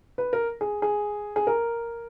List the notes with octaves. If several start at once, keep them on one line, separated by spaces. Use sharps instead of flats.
B4
A#4
G#4
G#4
G#4
A#4